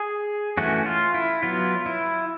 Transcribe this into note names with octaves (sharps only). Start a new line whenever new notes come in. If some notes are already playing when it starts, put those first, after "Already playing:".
Already playing: G#4
E3 A3 C#4 F#4
F4
E4
F#3 B3 F4
E4